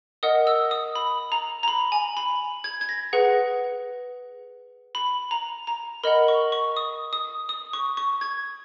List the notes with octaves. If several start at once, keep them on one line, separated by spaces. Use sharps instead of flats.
A#4 D#5 F#5 D#6
E6
D#6
B5
A#5
A#5
B5
G#5
B5
G#6
G#6
A#6
G#4 B4 F#5
B5
A#5
A#5
A#4 D#5 F#5 B5
C#6
C#6
D#6
D#6
D#6
C#6
C#6
G#6